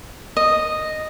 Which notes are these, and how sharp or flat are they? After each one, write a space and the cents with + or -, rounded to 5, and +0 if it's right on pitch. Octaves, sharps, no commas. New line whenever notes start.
D#5 -5